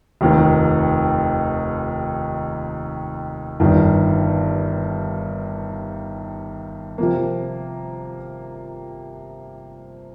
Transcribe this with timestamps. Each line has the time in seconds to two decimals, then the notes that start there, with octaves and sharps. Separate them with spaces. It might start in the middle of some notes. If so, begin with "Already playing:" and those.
0.21 F1 D#2 D#3
3.60 G1 G2 D#3
6.98 C3 F3 A#3